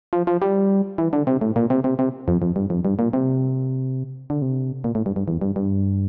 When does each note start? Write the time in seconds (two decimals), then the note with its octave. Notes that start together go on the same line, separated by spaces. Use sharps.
0.13 F3
0.27 F3
0.42 G3
0.98 E3
1.13 D3
1.27 C3
1.41 A2
1.56 A#2
1.70 C3
1.84 C3
1.99 C3
2.28 F2
2.42 F2
2.56 G2
2.70 F2
2.85 G2
2.99 A#2
3.13 C3
4.30 D3
4.42 C3
4.84 A#2
4.95 A2
5.06 G2
5.16 G2
5.28 E2
5.42 G2
5.56 G2